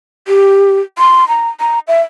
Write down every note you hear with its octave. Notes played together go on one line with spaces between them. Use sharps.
G4
C6
A#5
A#5
E5